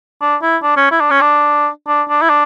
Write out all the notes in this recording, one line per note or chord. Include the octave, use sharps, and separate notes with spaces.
D4
E4
D4
C#4
E4
D4
C#4
D4
D4
D4
E4
D4